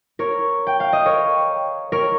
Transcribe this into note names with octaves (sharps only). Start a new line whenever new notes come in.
A#4 C#5
G5
F5
D#5
A#4 C#5
A#4 C#5